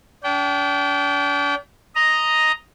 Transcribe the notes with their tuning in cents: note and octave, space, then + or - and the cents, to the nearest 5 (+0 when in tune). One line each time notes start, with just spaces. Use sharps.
D4 -40 G5 -20
D#5 +0 A#5 +0